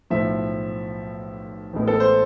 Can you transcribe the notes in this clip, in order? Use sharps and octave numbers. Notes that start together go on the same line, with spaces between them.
B1 A2 F3 E5
A1 A2 G#3 B3
A4
C5